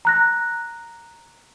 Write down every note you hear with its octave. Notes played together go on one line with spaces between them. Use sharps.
A#5 F#6 A#6